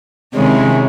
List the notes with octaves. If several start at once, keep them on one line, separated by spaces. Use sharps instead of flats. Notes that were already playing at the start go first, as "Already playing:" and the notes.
C3 D#3 G#3 C#4 E4